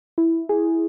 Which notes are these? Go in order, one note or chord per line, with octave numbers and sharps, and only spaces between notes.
E4
G#4